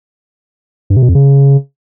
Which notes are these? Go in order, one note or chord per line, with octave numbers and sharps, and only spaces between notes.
G2
C3
B2
F2
C#3